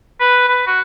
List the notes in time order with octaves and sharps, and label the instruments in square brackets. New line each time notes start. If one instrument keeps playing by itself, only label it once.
[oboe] B4
B4
F#4